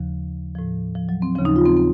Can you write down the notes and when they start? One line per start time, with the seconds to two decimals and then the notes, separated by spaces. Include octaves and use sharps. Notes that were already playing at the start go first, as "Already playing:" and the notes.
Already playing: D#2 C#3 F3
0.55 A2 F3
0.96 F3
1.09 F#3
1.22 C4
1.36 D#2 C#3 F3 C#4
1.45 D#4
1.56 F4
1.65 C4
1.76 C4